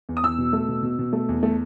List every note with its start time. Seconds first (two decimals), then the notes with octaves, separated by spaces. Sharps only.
0.09 E2
0.17 D#6
0.23 E2 E6
0.38 B2
0.53 A3
0.69 B2
0.83 B2
0.99 B2
1.13 A3
1.29 E2
1.43 A3